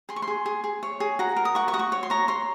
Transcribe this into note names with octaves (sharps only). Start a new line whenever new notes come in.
G#4 C6
C#6
C6
G#4
G#4
G#4
C#5
G#4
F#4 A#5
A#4
D#6
F#4 C#6
C#6
F#4 D#6
C#6
C#5
C6
C#5 A#5
C#5 C6